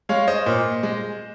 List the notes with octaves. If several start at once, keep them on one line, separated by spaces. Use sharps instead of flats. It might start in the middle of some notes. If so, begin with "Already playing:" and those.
G#3 C#5 F5
C5 D#5
A#2
G#3